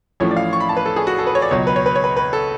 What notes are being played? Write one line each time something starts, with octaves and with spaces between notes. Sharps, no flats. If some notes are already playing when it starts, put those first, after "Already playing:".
A1 A2 F3 A3 C#4 C#5
D5
F5
C#6
B5
A5
B4
A4
G#4
F#4
A4
B4
C#5
D5
C#2 B2 F#3 C#5
B4
C#5
B4
C#5
B4
B4
A4